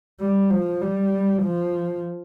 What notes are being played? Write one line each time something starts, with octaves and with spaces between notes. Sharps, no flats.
G3
F3
G3
F3